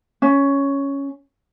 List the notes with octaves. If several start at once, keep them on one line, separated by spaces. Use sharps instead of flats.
C#4